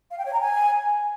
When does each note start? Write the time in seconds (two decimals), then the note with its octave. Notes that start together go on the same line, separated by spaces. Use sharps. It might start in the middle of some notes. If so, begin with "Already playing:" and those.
0.11 F5
0.18 G5
0.25 C#5
0.33 A#5
0.40 G#5